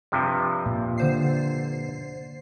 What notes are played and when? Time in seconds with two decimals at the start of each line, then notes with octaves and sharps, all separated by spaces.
0.12 G2 C3 F3
0.66 A#2
0.98 D3 C5 C7